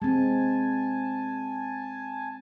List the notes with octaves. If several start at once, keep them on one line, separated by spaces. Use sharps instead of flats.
G#3 C4 G#5 A5